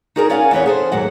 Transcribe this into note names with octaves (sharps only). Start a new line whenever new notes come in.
D#4 F#4 G#4 A#4 B4 D5
C#4 D5 F5 F#5 G#5
E2 E3 C4 B4 C#5
G#4 A4 C5
D#2 G#2 F#3 F#5